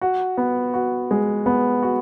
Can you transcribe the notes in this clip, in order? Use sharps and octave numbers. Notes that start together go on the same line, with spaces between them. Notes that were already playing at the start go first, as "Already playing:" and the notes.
F#4
B3
F#4
G#3
B3
F#4